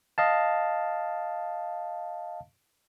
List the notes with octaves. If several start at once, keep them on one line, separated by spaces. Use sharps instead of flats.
D#5 F5 A5